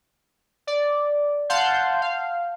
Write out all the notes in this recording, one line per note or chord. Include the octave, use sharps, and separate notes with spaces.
D5
F5 F#5 A5 C6 G6
F5